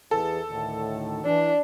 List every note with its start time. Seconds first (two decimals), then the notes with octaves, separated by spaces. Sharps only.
0.11 E2 E3 G#4 A4
0.50 D2 A2 D#3
1.25 E3 D4